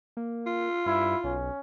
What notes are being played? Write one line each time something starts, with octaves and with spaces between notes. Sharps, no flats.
A#3
F4
G2 E4
B1 C#4